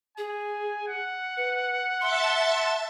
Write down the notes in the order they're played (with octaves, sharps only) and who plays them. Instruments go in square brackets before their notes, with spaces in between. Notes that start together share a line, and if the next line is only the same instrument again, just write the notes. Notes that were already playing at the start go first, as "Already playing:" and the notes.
[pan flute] G#4 [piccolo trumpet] G#5
[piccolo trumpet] F#5
[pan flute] B4
[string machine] E5 A5 A6 [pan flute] C6